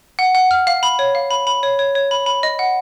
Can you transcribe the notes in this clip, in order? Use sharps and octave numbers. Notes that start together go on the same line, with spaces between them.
F#5
F#5
F6
F5
B5
C#5
F5
B5
B5
C#5
C#5
C#5
B5
B5
D#5
F#5